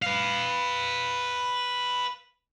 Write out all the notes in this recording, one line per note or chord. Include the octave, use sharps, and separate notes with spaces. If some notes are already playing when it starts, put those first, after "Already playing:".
B4 F5